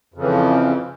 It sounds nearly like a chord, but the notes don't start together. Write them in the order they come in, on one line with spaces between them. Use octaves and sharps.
F2 C#3 E3 F3